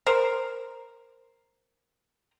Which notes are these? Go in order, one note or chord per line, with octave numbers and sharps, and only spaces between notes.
A#4 C5